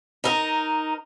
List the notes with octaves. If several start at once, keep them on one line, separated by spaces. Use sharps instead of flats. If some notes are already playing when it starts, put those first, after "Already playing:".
D#4 A#4